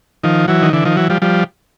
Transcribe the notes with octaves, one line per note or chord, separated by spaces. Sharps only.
D#3 F3
E3 F#3
D#3
D3 E3
D#3 F3
E3 F#3
F3 G3
F3 G3